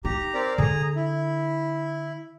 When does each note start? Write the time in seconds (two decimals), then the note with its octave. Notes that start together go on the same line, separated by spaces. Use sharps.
0.05 D#4 G4 A#5
0.34 C4 A#4 D5
0.58 D3 G#4 A#5
0.96 E4